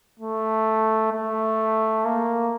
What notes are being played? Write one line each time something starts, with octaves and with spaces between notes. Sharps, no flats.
A3
A3
A#3